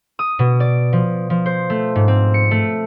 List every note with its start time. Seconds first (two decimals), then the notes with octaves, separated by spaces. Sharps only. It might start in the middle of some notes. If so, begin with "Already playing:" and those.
0.19 D#6
0.39 B2
0.60 D5
0.93 F3
1.30 F3
1.46 C5
1.70 A3
1.96 G#2
2.08 C4
2.34 C#7
2.51 A3